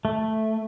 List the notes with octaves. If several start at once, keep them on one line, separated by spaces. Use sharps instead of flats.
A3